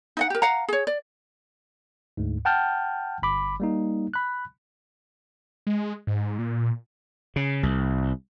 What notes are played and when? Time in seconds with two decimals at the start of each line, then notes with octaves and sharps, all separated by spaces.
0.17 D#4 D#5 F#5
0.30 G4 A#4
0.42 F5 F#5 A#5
0.68 G#4 C#5
0.87 D5
2.17 D2 G#2
2.45 F#5 G5 A5 F6 G6
3.22 G1 B5 D6
3.60 G3 A#3 D#4
4.14 B5 F#6
5.67 G#3
6.07 G#2
6.39 A#2
7.36 C#3
7.63 C2